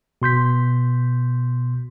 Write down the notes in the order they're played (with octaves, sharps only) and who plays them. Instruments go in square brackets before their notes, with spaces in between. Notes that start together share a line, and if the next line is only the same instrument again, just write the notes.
[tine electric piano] B2 C6 G6 B6